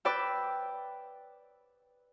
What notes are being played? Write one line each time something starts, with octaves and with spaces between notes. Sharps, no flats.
B4 D5 G5 E6